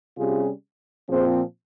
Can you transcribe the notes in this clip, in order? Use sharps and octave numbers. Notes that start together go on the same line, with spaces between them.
C3 G3 C#4 F4 G#4
A#2 F3 C4 G#4 C5